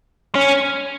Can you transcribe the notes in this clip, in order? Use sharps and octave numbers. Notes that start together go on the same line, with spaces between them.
C#4